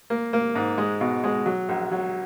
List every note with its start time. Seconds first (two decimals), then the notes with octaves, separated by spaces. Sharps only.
0.10 A#3
0.33 A#3
0.55 G#2
0.78 G#3
1.01 B2
1.24 G#3
1.46 F#3
1.69 A#1
1.91 F#3